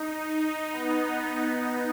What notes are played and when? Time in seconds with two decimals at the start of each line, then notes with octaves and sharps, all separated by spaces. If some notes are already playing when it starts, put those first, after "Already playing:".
Already playing: D#4
0.37 D#4
0.72 B3